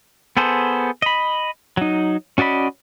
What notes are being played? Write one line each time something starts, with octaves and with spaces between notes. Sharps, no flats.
B3 G#4 A4 C5
D#5 B5
F#3 D#4
C#4 F#4 D5 D#5 B5